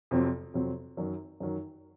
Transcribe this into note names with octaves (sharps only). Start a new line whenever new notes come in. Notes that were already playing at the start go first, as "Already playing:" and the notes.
F2 C3 F#3 C4
F2 C3 F#3 C4
F#2 D#3 F#3
F#2 D#3 F#3